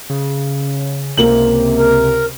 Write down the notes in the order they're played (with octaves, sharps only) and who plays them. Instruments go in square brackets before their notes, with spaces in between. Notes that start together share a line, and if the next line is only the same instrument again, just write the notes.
[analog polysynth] C#3
[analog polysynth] C#2 C3 [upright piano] A#3 F#7
[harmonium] A#4